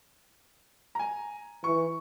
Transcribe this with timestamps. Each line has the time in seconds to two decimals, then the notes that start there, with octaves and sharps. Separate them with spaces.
0.95 G#5 A#5
1.64 E3 C#6